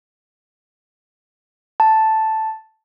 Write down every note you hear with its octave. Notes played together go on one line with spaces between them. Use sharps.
A5